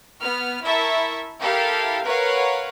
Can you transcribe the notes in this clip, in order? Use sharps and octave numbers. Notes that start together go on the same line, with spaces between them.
B3 F6
E4 A#4 E5 A5 C#6
E4 G4 A4 A#4 F5
A#4 B4 C#5 F5 F#5